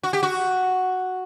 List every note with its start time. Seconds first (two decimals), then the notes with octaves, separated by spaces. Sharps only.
0.03 F#4
0.13 G4
0.23 F#4